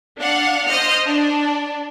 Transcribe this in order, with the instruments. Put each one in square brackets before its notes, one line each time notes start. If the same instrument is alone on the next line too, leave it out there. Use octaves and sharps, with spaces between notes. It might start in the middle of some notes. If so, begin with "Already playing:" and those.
[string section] D4 F5 F#5
C5 D#5 F6
D4